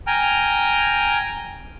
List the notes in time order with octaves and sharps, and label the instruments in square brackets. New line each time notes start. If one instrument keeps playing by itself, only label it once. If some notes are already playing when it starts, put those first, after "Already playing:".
[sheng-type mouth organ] G5 G#5 A#5 F6